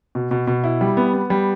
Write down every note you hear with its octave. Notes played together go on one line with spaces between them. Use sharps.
B2
B2
B2
E4
G3
B3
B3
G3